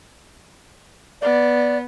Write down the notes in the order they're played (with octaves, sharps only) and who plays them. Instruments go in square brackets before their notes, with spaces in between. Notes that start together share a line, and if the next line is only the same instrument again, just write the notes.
[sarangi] B3 [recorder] D5